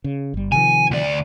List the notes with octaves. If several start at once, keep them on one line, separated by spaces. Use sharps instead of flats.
C#3
G1 G3
C3 D#3 F3 G#5
D2 D5